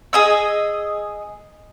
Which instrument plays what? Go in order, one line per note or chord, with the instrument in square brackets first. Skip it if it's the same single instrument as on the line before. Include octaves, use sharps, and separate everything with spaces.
[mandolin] G#4 D#5 E6